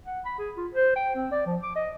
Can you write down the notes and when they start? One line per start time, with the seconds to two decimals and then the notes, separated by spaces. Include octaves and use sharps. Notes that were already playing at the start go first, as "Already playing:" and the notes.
0.05 F#5
0.25 B5
0.38 G#4
0.57 F4
0.74 C5
0.96 G5
1.15 C4
1.31 D5
1.46 F3
1.62 D6
1.75 D#5